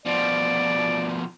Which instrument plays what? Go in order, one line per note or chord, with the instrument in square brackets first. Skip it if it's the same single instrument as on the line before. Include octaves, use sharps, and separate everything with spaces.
[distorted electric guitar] B2 F3 [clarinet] D5